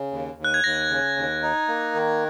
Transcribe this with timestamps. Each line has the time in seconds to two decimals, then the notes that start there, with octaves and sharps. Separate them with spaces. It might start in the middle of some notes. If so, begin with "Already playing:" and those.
Already playing: C#3
0.11 D#2
0.38 D#2
0.44 F#6
0.54 G#6
0.64 D#2 A#6
0.90 C#3
1.17 D#2
1.42 D#4
1.68 A#3
1.95 D#3